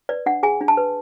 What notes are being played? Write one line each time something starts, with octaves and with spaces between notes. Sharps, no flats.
B4 D5
D4 F#5
G#4 G#5
D4
A5
B4